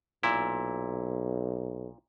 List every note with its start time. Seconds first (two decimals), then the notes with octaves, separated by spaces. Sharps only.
0.23 B1 A#2 E4